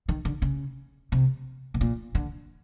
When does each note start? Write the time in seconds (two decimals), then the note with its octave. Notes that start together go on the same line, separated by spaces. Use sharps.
0.09 D#3
0.25 D3
0.42 C#3
1.12 C3
1.74 B2
1.81 A#2
2.15 D3